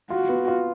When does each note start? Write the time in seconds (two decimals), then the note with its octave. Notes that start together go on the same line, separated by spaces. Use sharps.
0.10 F4 F#4
0.29 B3
0.48 F4